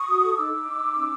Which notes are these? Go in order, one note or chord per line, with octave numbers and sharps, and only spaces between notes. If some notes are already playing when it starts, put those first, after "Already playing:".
Already playing: C#6 D#6
F#4
A4
D#4 D6 E6
D#4
D#4
D#4
C#4